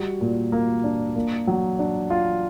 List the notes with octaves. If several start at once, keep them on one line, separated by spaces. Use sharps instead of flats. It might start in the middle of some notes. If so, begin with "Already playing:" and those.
Already playing: G3 F#4
A#2
A#3
D4
A#3
F#3
D4
F4